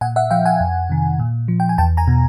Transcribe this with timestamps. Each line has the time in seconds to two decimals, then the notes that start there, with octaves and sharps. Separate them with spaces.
0.01 A#2 F#5 G#5
0.16 E5 F#5
0.31 F3 F5 G5
0.45 F#5 G#5
0.60 F2
0.90 C3 D#3
1.19 A#2
1.48 F3
1.60 G5
1.69 G#5
1.78 E2 G5 A5
1.97 G#5 A#5
2.08 B2